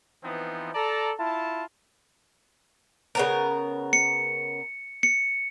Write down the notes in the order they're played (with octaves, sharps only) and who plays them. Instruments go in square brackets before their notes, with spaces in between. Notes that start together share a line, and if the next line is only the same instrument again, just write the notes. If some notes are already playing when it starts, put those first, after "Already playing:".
[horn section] E3 F3 B3 C4 D#4
A4 D5 A5 A#5
E4 F4 A5
[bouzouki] C#3 B3 A#4
[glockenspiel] C#7
C#7